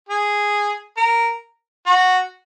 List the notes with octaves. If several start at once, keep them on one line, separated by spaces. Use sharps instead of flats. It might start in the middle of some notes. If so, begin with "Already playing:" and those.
G#4
A#4
F#4